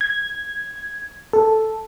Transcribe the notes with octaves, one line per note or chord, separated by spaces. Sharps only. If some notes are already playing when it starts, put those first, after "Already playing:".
G#6
A4